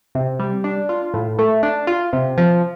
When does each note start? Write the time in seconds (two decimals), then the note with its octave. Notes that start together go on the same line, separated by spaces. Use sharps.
0.15 C3
0.39 G3
0.64 D4
0.89 F4
1.14 A2
1.39 A3
1.63 D4
1.87 F4
2.13 C3
2.38 F3